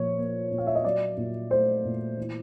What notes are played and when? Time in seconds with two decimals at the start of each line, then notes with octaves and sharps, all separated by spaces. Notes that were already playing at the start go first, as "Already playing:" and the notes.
Already playing: A#2 F3 C#5
0.18 A#3
0.51 A#2
0.58 F5
0.67 E5
0.75 D#5
0.84 F#3 D5
1.17 A#2
1.51 A3 C5
1.85 A#2
2.17 E3